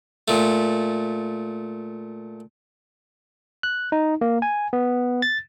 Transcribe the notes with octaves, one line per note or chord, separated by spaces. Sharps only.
A#2 A3
F#6
D#4
A#3
G#5
B3
A6